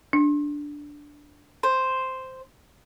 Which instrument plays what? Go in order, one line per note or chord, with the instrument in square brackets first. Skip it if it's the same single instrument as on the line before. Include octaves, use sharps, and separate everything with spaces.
[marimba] D4
[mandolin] C5